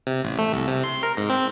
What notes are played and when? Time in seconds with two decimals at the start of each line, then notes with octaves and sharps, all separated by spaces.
0.07 C3
0.24 A1
0.39 A3
0.53 C2
0.68 C3
0.84 C6
1.03 A#4
1.17 G#2
1.30 C4